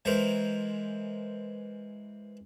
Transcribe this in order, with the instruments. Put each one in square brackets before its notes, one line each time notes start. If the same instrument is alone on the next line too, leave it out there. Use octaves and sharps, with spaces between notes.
[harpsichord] E3 G#3 A#4 C5